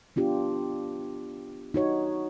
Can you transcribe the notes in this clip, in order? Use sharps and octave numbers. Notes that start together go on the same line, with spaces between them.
B3 D4 F4 G4
D#4 F#4 C#5